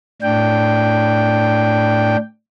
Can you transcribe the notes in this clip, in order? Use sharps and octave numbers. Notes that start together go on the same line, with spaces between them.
A2 D4 G5